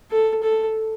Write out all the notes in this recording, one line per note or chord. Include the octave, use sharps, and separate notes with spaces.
A4
A4